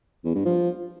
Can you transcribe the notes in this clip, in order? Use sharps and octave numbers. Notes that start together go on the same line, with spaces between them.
E2
G2
F3